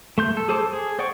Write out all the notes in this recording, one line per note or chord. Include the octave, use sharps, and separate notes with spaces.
A3 C6 G6
A4
G#4 A4 C5 A5 D6
G#4
C5 D5 F#5 G5 C#6